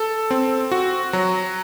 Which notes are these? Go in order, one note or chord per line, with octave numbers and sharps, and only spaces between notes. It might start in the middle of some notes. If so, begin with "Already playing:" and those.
Already playing: A4
C4
F#4
F#3